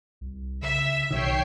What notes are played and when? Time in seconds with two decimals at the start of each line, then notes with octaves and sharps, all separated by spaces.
0.21 C2
0.62 C#3 E5
1.11 B1 B2 D#3 C#5 G5 C7